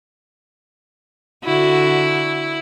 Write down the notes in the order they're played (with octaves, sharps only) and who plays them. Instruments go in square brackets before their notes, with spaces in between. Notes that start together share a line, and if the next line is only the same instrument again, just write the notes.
[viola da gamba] D3 F#4 [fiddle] E4